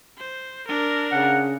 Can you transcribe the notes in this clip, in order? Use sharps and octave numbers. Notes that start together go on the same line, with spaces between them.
C5
D4 A#4
C#3 F#5